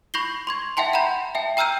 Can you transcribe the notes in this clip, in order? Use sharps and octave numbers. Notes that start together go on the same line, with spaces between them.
B5 C#6 G6 A#6 C7 G7
C6 C#6 G#6
E5 F#5 G5 A5 C6
F#5 A#5 B5 G6
E5 G5 A5
G5 A#5 E6 F6 G6 D#7